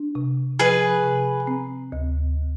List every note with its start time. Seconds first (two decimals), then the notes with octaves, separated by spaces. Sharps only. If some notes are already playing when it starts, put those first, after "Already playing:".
Already playing: D4
0.15 C3
0.59 F3 G#4 B4
1.04 C3
1.47 C4
1.92 D2